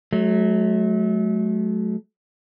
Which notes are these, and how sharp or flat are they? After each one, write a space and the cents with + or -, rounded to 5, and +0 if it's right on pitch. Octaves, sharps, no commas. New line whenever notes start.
F#3 +0 A3 -35